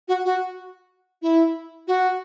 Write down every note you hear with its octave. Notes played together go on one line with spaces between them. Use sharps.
F#4
F#4
E4
F#4